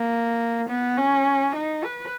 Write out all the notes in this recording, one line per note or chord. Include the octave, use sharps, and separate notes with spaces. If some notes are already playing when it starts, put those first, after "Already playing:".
Already playing: A#3
B3
C#4
D#4
B4